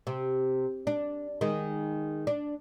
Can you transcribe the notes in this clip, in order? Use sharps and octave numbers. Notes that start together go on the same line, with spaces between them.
C3
D4
D#3 G#3
D4